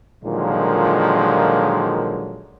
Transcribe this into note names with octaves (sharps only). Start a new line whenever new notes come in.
A#2 D3 D#3 F3 F#3 G#3